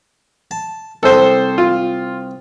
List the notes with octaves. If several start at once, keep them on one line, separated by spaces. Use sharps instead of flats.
A5
C2 C4 A4 C5
F4